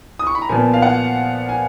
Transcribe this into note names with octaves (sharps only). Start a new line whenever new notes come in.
D#6
C#6
B5
A#5
A#2 F3 B3 G#5
F5
F#5
G#5